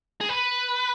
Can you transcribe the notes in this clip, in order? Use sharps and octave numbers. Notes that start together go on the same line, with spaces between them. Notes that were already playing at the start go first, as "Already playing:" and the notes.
G#4
B4